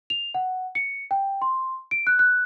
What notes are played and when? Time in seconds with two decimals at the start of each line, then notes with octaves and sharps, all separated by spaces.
0.10 F7
0.34 F#5
0.75 C#7
1.11 G5
1.42 C6
1.91 D7
2.07 F#6
2.19 F#6